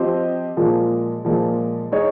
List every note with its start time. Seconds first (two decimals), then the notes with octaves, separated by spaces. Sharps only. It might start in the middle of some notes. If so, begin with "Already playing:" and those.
Already playing: F3 C4 G4 C5 D#5
0.57 A#2 F3 G#3
1.25 A#2 F3 G#3
1.92 G#3 D#4 G#4 C#5